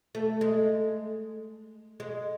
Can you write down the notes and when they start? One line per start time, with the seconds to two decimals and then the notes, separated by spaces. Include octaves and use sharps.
0.15 A3
0.41 G#3
2.00 G#3